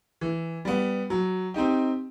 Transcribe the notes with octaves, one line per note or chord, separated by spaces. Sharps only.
E3
G3 B3
F#3
C4 D#4 G4